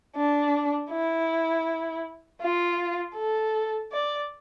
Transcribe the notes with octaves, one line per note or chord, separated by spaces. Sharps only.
D4
E4
F4
A4
D5